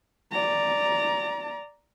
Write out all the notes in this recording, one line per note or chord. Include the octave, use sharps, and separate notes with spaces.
D5 A#5